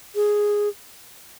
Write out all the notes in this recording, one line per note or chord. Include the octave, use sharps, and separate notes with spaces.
G#4